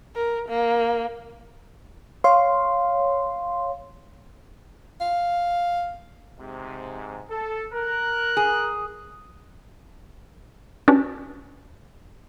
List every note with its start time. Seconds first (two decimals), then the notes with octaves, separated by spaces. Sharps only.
0.15 A#4
0.48 A#3
2.24 C#5 F5 C6
5.00 F5
6.40 G#2 C3
7.30 A4
7.73 A#4 F#6
8.37 G#4
10.88 C#4 D4 F#4 G4 B4